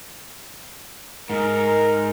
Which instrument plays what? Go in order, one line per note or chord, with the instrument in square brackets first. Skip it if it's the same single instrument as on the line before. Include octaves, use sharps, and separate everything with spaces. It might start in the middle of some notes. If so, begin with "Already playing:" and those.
[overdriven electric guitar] G#2 [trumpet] A#4